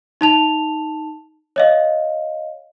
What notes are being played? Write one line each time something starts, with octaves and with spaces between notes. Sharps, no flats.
D#4 A5 F7
C#5 D#5 F5